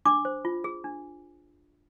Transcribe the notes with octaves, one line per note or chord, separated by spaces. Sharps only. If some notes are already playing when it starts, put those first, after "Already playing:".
D4 D6
C5
F4
G#4
D4